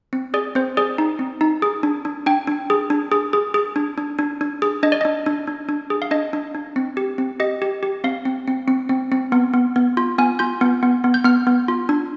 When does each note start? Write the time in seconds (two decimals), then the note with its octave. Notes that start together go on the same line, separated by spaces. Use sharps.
0.13 C4
0.34 G#4 D5
0.55 C4 C5
0.77 G#4 D5
0.98 D#4
1.19 C4
1.41 D#4
1.62 G#4
1.83 D4
2.05 D4
2.26 D4 G5
2.47 D4
2.70 G#4
2.90 D4
3.12 G#4
3.33 G#4
3.54 G#4
3.76 D4
3.98 D4
4.19 D4
4.41 D4
4.62 G#4
4.83 D4 D#5
4.92 D5
5.01 D4 D#5
5.26 D4
5.47 D4
5.69 D4
5.90 G#4
6.02 F5
6.11 D4 D#5
6.33 D4
6.54 D4
6.76 C4
6.97 G4
7.18 C4
7.40 G4 D#5
7.62 G4
7.83 G4
8.04 C4 F5
8.25 C4
8.48 C4
8.68 C4
8.89 C4
9.12 C4
9.32 B3
9.54 B3
9.76 B3
9.97 F4
10.18 B3 G#5
10.39 F4 G6
10.61 B3
10.83 B3
11.04 B3
11.14 G6
11.24 B3 F6
11.47 B3
11.68 F4
11.89 D4